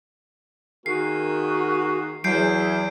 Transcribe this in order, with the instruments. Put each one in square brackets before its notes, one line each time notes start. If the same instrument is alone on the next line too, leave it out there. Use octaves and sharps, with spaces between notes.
[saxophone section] D#3 A#3 G#4 [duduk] F#4 [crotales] C7
[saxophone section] E2 E3 [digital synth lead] F#3 [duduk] G#4 [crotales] G6 C7 D7